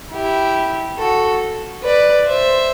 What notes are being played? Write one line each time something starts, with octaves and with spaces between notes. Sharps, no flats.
E4 G4
F#4 A4
B4 D5
C5 E5